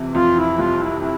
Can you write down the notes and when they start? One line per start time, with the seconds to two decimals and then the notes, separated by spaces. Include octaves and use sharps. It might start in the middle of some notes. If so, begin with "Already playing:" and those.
Already playing: F2 C3 E3
0.14 F2 F4
0.36 E4
0.58 C2 F4
0.80 E4
1.01 F3 E4